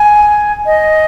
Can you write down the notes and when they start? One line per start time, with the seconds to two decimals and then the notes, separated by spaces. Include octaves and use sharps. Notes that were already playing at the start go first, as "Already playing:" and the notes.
Already playing: G#5
0.66 D#5